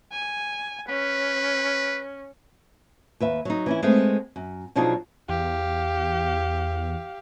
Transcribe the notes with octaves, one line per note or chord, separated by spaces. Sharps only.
G#5
C#4 B4
D#2 B4 E5
F#3 D#4
E3 C#4 E4
G#3 A3 B3 C4
F#2
B2 F3 F#3 D4 D#4 G#4
E2 G4 F5